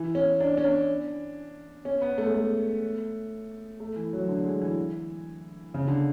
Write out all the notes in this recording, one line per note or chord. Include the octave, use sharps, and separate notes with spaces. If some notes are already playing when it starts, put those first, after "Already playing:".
Already playing: E3
C#4
D4
C#4
D4
C#4
B3
A3
G#3
A3
A3
E3
F#3
D3
G#3
E3
C#3
D3